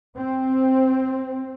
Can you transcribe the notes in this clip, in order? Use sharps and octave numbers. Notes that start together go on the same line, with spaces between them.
C4